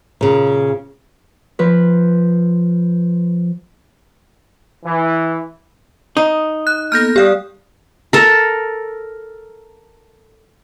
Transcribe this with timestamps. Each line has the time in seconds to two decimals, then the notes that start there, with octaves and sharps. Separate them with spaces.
0.21 A#2 C#3
1.59 F3 B4
4.85 E3
6.17 D#4 D#6
6.67 F#6
6.92 A#3 B3 A4 F6 G6 A#6
7.16 G3 G4 D5 F5 D#6
8.13 A4 A#4